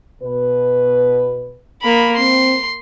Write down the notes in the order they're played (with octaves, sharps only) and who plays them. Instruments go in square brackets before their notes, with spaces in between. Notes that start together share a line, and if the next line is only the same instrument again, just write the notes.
[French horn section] B2 B4
[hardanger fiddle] A#3 B5
[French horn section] C4 [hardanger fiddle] C6